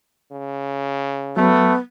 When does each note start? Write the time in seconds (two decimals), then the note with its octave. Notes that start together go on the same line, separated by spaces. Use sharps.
0.32 C#3
1.37 F#3 A3 B3